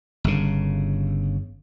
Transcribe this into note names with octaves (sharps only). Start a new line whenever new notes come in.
G1 C#3